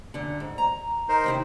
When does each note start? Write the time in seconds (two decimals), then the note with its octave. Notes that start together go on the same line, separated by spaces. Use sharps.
0.14 F#2 D3
0.40 G#2
0.58 A#5
1.09 D#4 A#4 C5
1.24 C3 D#3 E4